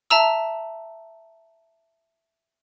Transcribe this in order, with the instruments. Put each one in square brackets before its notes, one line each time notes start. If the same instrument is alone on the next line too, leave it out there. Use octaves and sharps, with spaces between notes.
[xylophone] E5 A5 A#5 E6